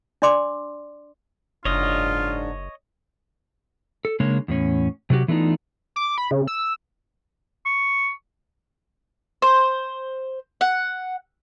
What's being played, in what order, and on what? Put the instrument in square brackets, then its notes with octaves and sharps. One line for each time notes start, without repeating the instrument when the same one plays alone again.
[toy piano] D4 D5 C6 D6
[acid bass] F#1 [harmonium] G#2 D4 [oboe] F4 [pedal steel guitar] C#5 D#5
[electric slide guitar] A4
C#3 G#3 A#3 D4 C#5
E2 A2 C#4
C3 F#3 F#4 G4
E3 A3 B3 D4 D#4 F4
[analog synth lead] D6
B5
C#3
E6
[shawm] C#6
[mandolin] C5
F#5